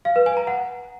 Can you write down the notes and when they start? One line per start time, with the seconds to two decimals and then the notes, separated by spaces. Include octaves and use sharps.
0.05 F5
0.16 B4
0.26 G#5
0.37 A#5
0.47 F#5